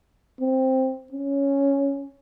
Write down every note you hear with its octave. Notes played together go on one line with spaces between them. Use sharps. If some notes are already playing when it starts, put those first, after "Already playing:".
C4
C#4